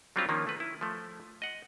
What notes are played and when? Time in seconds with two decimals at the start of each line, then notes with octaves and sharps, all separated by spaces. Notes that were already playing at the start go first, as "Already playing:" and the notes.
0.16 F#3 G3 C4 D4 F4 G4
0.29 D#3 F3 A#3 C#4
0.47 A3 B4
0.60 E4
0.81 F3 A3
1.42 D#5 F#5